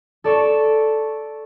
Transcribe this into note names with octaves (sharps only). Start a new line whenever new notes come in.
A4 D5 C#6 E7